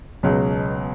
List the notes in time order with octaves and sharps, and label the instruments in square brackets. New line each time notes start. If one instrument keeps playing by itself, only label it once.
[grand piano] C#2 B2 F#3